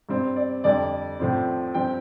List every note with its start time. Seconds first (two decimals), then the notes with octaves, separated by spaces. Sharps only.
0.09 G2 G3 C4
0.36 D5
0.64 F2 D3 G3 D5
1.20 A2 F3 A3 C4
1.74 G2 F3 C4 G5